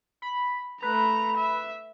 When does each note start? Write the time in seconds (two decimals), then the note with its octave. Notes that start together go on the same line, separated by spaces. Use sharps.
0.22 B5
0.82 A3 B4 A#5
1.37 E5